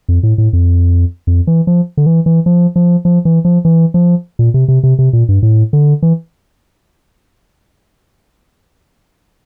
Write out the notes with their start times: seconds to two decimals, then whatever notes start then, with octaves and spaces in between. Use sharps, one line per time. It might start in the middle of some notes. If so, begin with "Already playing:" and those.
0.09 F2
0.23 A2
0.38 A2
0.53 F2
1.27 F2
1.47 E3
1.67 F3
1.97 D3
2.06 E3
2.26 E3
2.46 F3
2.76 F3
3.05 F3
3.25 E3
3.45 F3
3.65 E3
3.94 F3
4.39 A#2
4.54 C3
4.68 C3
4.83 C3
4.99 C3
5.13 A#2
5.29 G2
5.43 A2
5.73 D3
6.03 E3